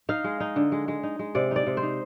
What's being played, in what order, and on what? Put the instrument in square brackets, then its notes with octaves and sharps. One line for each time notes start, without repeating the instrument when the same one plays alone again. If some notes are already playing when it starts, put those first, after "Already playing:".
[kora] D#4 F5
G#3
D#4
D3
G#3
G#3
D#4
G#3
C3 D5
D#4 D5
C3
C5
D#4